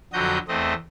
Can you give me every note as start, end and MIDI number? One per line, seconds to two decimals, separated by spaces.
0.13 0.38 41
0.13 0.38 50
0.13 0.38 54
0.13 0.38 66
0.13 0.38 75
0.13 0.38 91
0.48 0.74 40
0.48 0.74 57
0.48 0.74 60
0.48 0.74 75